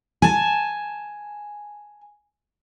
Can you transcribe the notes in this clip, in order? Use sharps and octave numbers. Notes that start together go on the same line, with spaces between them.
G#5 A5